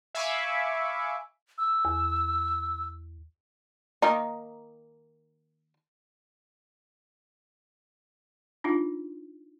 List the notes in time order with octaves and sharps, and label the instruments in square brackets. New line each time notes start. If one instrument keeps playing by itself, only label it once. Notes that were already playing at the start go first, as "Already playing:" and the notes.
[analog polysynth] E5 F5 G#5 B5 C#6 D6
[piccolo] E6
[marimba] E2
[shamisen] D#3 A#3 D#4
[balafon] D4 D#4 F4